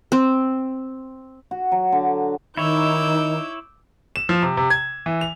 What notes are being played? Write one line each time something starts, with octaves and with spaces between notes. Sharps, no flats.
C4
F#4
F#3
D3
D#3 D#4 E4 C#5 D6 E6 G6
E7
F3
C3
C3
G#6
E3
F7